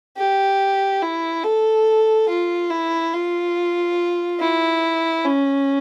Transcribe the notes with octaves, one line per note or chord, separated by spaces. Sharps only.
G4
E4
A4
F4
E4
F4
E4
C#4